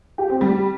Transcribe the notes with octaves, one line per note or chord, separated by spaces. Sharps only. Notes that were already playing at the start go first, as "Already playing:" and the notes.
G4
C4
G3